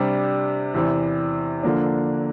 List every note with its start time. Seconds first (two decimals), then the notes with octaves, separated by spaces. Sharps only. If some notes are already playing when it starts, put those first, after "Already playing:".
Already playing: C3 G3 D4
0.74 E2 C3 E3
1.63 D3 F3 A#3 D4